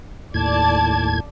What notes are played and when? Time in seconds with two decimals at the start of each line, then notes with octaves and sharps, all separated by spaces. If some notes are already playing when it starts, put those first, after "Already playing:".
0.34 D#2 A2 D5 A5 G#6